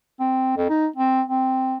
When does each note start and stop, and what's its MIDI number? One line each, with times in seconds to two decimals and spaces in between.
0.19 0.52 60
0.57 0.68 41
0.69 0.87 63
0.96 1.22 60
1.28 1.76 60